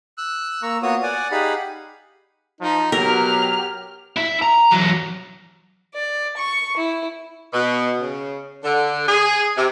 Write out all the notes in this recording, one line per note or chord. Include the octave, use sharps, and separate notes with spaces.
E6 F#6
A#3 A#5 C#6 E6
A#3 B3 F4 F#4 C#5 D#6
D5 F#5 G#5
D#4 G4 G#4 F5 F#5 B5
F3 D#4
B2 F#3 G4 A#4 F6
E4 E5
A#5
E3 F#3
D5
C#6
E4
B2
C#3
D3
G#4
C3